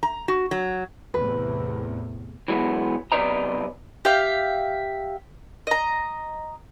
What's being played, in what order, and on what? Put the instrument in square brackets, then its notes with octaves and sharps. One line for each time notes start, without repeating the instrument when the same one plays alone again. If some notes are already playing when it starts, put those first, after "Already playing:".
[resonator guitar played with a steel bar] A#5
F#4
F#3
[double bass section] E2 A2 C3 [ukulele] B4
[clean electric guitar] E3 F#3 G#3 B3
B1 C3 B4 D5 D#5 A#5
[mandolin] G4 E5 F5
D#5 A#5